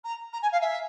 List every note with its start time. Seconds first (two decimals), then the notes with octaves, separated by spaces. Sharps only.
0.04 A#5
0.32 A#5
0.42 G#5
0.52 F5
0.61 E5